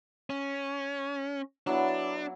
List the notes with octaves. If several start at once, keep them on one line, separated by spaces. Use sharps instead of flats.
C#4
F#3 B3 D4 E4